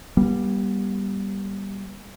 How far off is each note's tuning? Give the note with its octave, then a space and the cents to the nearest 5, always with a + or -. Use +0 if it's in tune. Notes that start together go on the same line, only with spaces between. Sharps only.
G3 +0 B3 -45